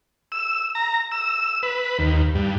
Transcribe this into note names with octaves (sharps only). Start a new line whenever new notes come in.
E6
A#5
E6
B4
D#2
G2